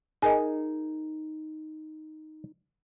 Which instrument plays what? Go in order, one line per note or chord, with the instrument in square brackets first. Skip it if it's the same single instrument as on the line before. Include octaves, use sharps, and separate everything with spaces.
[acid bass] D#4 [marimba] G#4 A#4 D#5 [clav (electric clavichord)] G#5